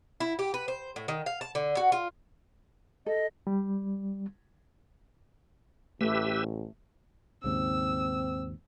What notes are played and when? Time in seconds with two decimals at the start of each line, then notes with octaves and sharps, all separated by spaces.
0.20 E4
0.39 G4
0.54 B4
0.68 C5
0.96 A2
1.08 D#3
1.26 F5
1.41 A5
1.55 D3
1.77 F#4
1.92 F4
3.06 A4 D#5
3.47 G3
6.01 A1 A3 G4 B4 E6
7.44 D#2 G#2 C#3 C4 E6